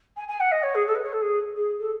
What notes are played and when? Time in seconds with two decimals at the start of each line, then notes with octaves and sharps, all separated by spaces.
0.17 G#5
0.28 G#5
0.40 F#5
0.51 D#5
0.63 C#5
0.75 G#4
0.87 A4
0.95 B4
1.04 C#5
1.13 A4
1.21 G#4
1.56 G#4
1.80 A4